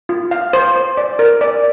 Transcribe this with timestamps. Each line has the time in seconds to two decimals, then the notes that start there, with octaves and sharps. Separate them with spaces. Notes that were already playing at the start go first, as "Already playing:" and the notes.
0.09 F4
0.31 F5
0.53 C5
0.76 C5
0.97 D5
1.19 A#4
1.41 D5